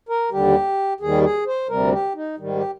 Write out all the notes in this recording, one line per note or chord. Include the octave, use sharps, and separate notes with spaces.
A#4
D#2 D3 G3 G4
D#2 D#3 G3 G#4
G#4
C5
D2 C3 G3 A#4
G4
D#4
G#2 D#3 G3
G4